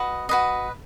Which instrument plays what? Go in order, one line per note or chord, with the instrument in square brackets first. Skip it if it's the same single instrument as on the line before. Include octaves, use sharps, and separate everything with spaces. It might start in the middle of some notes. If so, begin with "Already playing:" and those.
Already playing: [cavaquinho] F#4 B4 D#5
F#4 B4 D#5